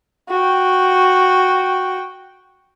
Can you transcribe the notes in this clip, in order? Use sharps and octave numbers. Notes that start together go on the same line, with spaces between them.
F#4 G5